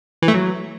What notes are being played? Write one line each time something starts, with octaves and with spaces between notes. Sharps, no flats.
E3
A3
F#3